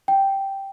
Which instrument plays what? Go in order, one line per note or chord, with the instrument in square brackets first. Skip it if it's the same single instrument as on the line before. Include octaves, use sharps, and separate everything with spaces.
[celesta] G5